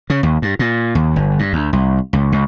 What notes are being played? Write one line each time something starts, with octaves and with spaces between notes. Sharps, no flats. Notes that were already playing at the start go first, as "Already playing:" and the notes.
C#3
D#2
G2
A#2
D#2
G1
G2
D2
C2
C#2
C#2